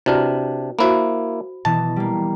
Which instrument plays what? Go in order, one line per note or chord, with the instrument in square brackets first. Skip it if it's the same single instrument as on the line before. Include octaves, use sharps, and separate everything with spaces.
[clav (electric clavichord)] C3 D4 [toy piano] E4 F#4 B4
[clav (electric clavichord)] A#3 E4 [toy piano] F#4 C5 B5
[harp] B2 E3 [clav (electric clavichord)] A5
[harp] G3 A#3